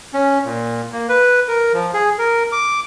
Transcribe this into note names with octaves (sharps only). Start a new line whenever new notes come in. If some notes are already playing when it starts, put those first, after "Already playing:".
C#4
A#2
A#3
B4
A#4
F3
G#4
A#4
D6